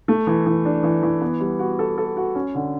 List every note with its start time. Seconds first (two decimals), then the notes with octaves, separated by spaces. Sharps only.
0.08 A3
0.27 E3
0.46 E3
0.65 D4
0.83 E3
1.03 E3
1.21 B3
1.40 G3
1.59 F#4
1.79 A4
1.98 A4
2.17 F#4
2.35 C#4
2.55 D3